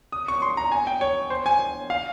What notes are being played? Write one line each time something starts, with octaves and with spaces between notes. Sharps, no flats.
D#6
C#6
C6
A#5
G#5
G5
C#5
C5
G#5
F5